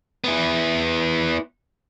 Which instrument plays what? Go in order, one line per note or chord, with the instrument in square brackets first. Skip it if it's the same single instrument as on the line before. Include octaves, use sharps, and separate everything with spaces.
[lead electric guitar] B3 E4